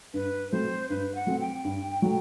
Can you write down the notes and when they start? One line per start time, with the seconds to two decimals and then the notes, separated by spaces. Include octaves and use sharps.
0.14 G2 B4
0.51 F#3 A3 C4 C5
0.89 G2 B4
1.15 F#5
1.27 F#3 A3 C4
1.40 G5
1.65 G2
2.02 F#3 A3